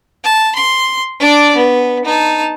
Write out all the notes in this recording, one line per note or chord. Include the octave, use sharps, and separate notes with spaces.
A5
C6
D4 D5
B3
D#4 A5